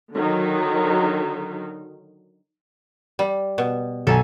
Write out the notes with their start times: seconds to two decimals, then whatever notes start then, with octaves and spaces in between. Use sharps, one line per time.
0.12 D3 D#3 F#3 D#4
3.19 G3
3.58 B2
4.07 B1 A4 G#5